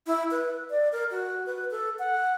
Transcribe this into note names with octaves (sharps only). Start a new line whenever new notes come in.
E4
B4
D5
A#4
F#4
B4
A4
F#5